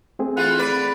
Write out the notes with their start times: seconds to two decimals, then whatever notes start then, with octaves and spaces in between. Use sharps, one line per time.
0.19 A3 C4 G#4
0.37 E3 F4 F#5
0.59 B4 D5